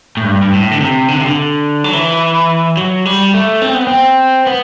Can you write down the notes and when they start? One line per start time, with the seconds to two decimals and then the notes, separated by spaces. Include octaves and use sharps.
0.17 A2
0.24 G2
0.42 G2
0.52 A2
0.71 D3
0.80 C3
1.08 D3
1.18 C3
1.25 D3
1.84 F#3
1.93 E3
2.77 F#3
3.05 G3
3.34 A3
3.62 C4
3.74 B3
3.87 C4
4.47 B3